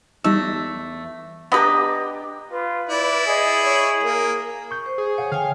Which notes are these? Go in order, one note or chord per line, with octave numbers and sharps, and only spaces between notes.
E2 G3 A3 D#4 E6
B3 D4 G4 B4 D#5 A#5
F4 B4
E4 D5
G#4 D#5
C#5
A#3 A#4
C#6 G6
C5
G#4
C#5 F5 F#5
D3 C#5 F5 G5 G#5